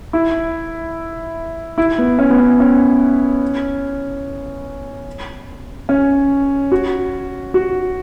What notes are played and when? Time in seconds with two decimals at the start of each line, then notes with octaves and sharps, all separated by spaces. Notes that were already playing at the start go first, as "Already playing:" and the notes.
0.13 E4
1.78 E4
1.98 B3
2.19 C#4
2.30 B3
2.39 C#4
2.60 C#4
5.89 C#4
6.72 F#4
7.54 F#4